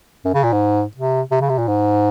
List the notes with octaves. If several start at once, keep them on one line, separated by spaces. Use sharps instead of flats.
F#2
C#3
A#2
G#2
C3
C3
C#3
C3
A#2
G#2